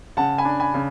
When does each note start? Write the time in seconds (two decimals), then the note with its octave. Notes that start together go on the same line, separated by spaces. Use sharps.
0.17 C#3 F#5 A5
0.38 G#5 B5
0.45 D4
0.59 G#5 B5
0.74 C#3